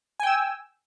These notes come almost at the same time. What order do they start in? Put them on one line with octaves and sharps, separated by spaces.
G#5 G5 E6